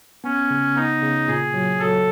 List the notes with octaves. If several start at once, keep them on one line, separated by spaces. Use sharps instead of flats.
B3 C#4
C#3
B3 D#4
C#3
A#2 G#4
F#3
F#3 A4